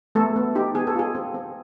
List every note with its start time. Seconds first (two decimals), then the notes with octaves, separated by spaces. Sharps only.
0.15 A3 B3 A4
0.36 B3
0.55 D#4 G4
0.75 B3 G#4
0.87 A4
0.95 F4 G#4
1.15 C4
1.34 C4